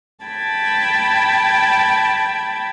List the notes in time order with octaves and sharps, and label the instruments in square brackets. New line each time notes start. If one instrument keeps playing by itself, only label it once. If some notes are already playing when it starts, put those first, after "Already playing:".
[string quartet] G5 A5 B5 G#6